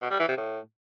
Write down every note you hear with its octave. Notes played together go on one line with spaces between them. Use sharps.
B2
G3
E3
C3
A2